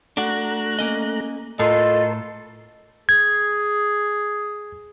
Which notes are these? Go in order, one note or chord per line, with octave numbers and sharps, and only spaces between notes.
A3 D4 F#4 A#5 F#6
A#3 C#4 D#5
A2 F4 A4 A#4 D#5 A5 C6
G#4 G#6